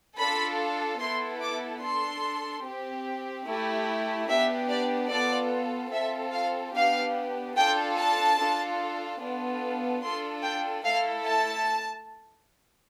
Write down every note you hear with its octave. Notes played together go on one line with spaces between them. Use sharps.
D4 F4 A4 B5
B3 E4 A4 C6
D6
D4 A4 C6
C4 G4
A3 E4 G4
B3 D4 G4 E5
D5
B3 F4 A4 D5
C4 F4 A4 E5
F5
B3 D4 G4 F5
D4 F4 A4 G5
A5
D4 F4 A4
B3 D4 F4 A4
D4 F4 A4 C6
G5
A3 E4 A4 F5
A5